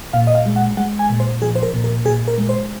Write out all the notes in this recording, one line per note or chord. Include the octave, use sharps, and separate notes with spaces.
A#2 F5
D#5
F5
G#3
F#5
G#3 F#5
G#5
A#2
C5
F3 G#4
C5
A#4
A#2
A#4
A#2 G#4
A#4
G#3
C5